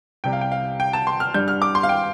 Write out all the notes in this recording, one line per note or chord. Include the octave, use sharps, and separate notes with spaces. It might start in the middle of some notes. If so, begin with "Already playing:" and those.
C2 C3 G3 G5
F5
G5
F5
G5
A5
C6
F6
G2 G3 G6
F6
D6
C6
F5
G5